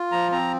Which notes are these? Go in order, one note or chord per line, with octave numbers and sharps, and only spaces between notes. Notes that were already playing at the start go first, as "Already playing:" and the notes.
Already playing: F4
F3 A#5
C4 A#5